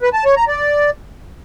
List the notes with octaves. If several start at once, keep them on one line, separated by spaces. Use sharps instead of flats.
B4
A5
C#5
A#5
D5